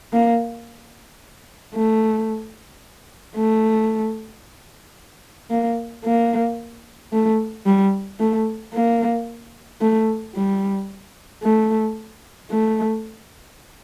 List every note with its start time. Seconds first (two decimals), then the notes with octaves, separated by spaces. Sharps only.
0.13 A#3
1.74 A3
3.36 A3
5.51 A#3
6.05 A#3
7.13 A3
7.66 G3
8.20 A3
8.74 A#3
9.81 A3
10.35 G3
11.43 A3
12.51 A3